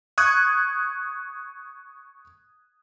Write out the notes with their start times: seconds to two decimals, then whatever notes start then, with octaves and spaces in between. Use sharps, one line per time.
0.18 C#6 D#6 F#6 G#6